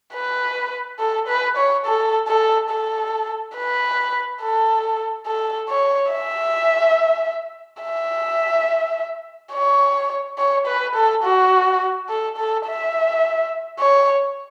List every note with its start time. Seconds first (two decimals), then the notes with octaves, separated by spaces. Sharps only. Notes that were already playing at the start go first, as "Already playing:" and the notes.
0.14 B4
0.99 A4
1.28 B4
1.57 C#5
1.86 A4
2.28 A4
2.70 A4
3.56 B4
4.41 A4
5.27 A4
5.69 C#5
6.12 E5
7.82 E5
9.53 C#5
10.38 C#5
10.67 B4
10.95 A4
11.24 F#4
12.09 A4
12.37 A4
12.67 E5
13.79 C#5